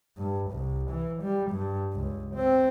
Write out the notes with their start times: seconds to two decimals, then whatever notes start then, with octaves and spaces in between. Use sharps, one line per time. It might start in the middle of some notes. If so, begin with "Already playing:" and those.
0.17 G2
0.51 C2
0.90 E3
1.23 G3
1.51 G2
1.93 C#2
2.35 C4